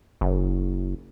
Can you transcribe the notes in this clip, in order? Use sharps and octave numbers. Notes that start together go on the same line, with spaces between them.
F#1